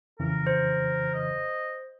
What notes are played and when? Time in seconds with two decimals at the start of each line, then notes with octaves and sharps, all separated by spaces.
0.20 F2 C#3 E3 A#4
0.47 C5
1.14 D#5